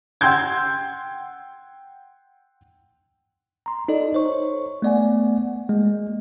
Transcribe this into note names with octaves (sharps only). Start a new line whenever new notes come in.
F#5 G5 C6 E6 G6 G#6
A#5 C6
D#4 A4 D5 D#5
C5 C#5 C#6
A3 B3 D5 F#5 G#5
G#3 A#3